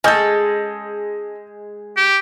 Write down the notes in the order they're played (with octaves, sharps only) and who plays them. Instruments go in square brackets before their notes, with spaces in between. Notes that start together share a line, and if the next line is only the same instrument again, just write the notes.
[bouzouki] G#3 [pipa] C#4 A4 [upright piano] D#5 G6
[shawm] G4